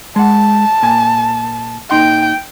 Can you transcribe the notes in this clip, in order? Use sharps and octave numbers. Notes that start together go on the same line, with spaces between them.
G#3 F#5 A5
A#2 G#5
A#2 D#4 G5 C6